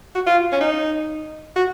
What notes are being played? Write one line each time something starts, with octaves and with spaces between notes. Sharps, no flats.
F#4
F4
C#4
D#4
F#4